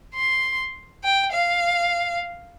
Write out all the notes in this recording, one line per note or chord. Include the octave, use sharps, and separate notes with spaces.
C6
G5
F5